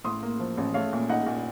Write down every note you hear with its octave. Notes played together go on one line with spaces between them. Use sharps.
A2 C6 D#6
A#3
F3
A1
A3 C#5 F5
A#2
D#4 D#5 F#5
A#2